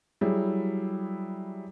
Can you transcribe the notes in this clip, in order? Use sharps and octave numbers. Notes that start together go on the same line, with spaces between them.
F#3 G3 E4 G#4